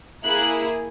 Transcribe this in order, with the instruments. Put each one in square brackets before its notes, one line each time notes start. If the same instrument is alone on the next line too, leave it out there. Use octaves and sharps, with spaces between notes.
[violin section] A#3 E4 G#4 F#6